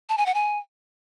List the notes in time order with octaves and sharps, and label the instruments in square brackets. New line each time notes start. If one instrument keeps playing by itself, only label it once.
[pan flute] A5
G#5
F#5
G#5